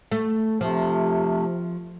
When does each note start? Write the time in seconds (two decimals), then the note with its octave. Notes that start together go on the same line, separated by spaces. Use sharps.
0.12 A3
0.61 C3 F3 A3